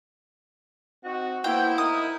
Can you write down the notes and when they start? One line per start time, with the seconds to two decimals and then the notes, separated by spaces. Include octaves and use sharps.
1.03 C4 D#4 F#4
1.44 A#3 B3 E4 C5 G5
1.78 D#4 A#4 D#6